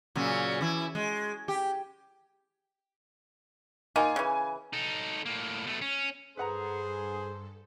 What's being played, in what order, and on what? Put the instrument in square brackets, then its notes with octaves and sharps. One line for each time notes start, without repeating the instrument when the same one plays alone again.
[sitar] A#2 C#3 F#3
E3 E4
G#3
G4
[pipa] A#3 D#4 F4 [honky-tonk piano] G#5
[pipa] C#3 E3
[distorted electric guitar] D#4 A4
A2 A#3
B2 A3
C#4
[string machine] G2 A4 [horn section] G#4 [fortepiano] B4 F#5 A#5 [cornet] C5